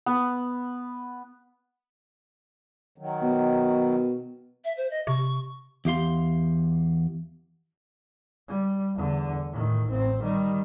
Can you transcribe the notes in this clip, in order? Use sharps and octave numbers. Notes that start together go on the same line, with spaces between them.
B3
D#3 F#3
B2
E5
C5
D#5
C3 C#6
E2 G4 F5 C6
G3
E2 D3
A2 D#3
A1 C4
D#3 G3